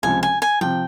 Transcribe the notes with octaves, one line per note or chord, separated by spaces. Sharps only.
C#2 C3 F3 G#5
G#5
G#5
C3 F3 G5